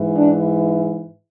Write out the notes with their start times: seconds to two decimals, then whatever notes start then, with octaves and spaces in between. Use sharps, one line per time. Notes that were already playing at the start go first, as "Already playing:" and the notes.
Already playing: G#2 E3
0.15 D4